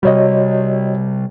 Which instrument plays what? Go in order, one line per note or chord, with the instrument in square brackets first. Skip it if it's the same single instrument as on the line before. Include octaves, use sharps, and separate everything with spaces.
[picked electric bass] C3 G3 [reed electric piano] F#4 C#5 D#5